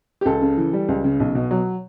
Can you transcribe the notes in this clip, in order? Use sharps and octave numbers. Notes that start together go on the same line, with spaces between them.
G4
C#2 A4
C#3
E3
G3
C#2
C#3
B1
B2
F#3